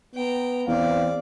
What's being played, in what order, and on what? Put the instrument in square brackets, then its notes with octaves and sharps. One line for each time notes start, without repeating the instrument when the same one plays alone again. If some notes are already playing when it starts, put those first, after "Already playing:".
[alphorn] B3 [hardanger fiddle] G5 A#5
[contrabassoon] E2 [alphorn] C4 [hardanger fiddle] D5 [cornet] F5